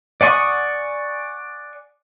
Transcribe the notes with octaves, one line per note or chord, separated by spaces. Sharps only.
D5 F#5 G#5 C#6 D#6